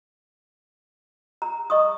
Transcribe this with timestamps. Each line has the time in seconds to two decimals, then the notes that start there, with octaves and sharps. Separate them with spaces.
1.42 A#5
1.70 D#5 C#6 D#6